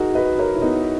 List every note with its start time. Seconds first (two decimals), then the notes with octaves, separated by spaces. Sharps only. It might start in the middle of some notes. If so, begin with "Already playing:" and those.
Already playing: D#4 F#4 G#4 A#4
0.15 B4 D#5
0.38 A#4 C#5
0.54 E4
0.62 B3 D#4